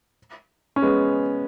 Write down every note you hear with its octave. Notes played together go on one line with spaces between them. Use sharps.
C#4
G#3 B3